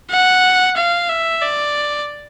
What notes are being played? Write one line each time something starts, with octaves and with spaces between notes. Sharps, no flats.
F#5
F5
E5
D5